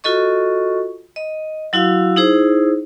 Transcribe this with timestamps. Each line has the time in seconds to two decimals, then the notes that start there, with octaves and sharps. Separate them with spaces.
0.04 F4 F#4 A4 D#5 C#6
1.16 D#5
1.73 F#3 E4 F#4 F5 E6
2.16 D#4 E4 G#4 C5